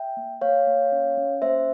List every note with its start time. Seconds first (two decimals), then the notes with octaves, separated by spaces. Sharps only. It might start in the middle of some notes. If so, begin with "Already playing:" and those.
Already playing: E5 G5
0.17 A#3
0.41 A#3 C#5 F5
0.67 A#3
0.92 C#4
1.17 C#4
1.42 A#3 C5 E5